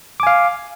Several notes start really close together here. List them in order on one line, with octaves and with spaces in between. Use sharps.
D6 G#5 F5